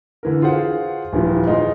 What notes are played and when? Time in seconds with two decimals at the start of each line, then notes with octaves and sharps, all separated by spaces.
0.23 D3 E3 A#4
0.42 F4 F#4 G#4 C5 F5 F#5
1.13 D#1 E3 F3
1.46 G#3 D#4 F4 G#4